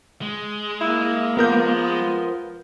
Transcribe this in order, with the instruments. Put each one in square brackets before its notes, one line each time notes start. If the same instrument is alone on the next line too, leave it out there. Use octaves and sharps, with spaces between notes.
[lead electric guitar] G#3
[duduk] A#3 [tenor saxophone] E4
[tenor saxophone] F3 [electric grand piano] B3 A#4 G6